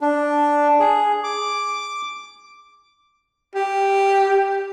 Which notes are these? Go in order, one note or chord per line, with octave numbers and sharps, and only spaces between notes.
D4
G#4
D6
G4